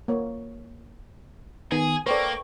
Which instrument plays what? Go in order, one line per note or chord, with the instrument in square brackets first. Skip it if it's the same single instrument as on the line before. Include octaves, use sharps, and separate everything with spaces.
[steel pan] A#3 C#5
[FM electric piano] D#3 B3 [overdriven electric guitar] G#4 [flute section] G#5
[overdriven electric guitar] A#3 [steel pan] A4 B4 [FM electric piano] C5 D5 [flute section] G5 C#6